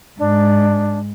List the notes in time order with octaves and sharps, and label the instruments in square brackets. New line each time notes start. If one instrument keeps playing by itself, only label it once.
[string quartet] G#2 [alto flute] D4